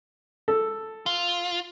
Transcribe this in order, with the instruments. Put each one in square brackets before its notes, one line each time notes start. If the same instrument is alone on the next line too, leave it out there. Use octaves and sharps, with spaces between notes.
[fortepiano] A4
[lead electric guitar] F4